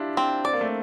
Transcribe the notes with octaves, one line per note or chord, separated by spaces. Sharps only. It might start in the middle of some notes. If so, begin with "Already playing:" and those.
Already playing: D4 E4 F4 G4
C4
C4 D5
A#3
A3